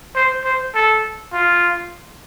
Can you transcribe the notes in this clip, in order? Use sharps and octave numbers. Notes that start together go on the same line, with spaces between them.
C5
C5
A4
F4